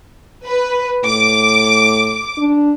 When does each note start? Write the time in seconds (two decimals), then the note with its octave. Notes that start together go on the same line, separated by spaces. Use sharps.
0.45 B4
1.04 A2 D6
2.38 D4